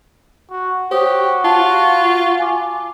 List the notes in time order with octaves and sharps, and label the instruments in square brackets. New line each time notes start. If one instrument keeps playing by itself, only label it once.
[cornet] F#4
[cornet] F#4 [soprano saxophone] G4 [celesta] C5 C#5 D#6
[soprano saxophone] F4 [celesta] A5
[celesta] G#5 D6